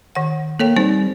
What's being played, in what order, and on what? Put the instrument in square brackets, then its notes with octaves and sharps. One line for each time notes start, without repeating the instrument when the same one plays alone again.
[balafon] D#3 F#5
[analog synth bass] A#3 [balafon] A4 C#5 G5
[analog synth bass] G3 [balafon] C4 D#4 C5